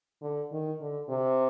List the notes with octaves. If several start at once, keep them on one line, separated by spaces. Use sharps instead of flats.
D3
D#3
D3
C3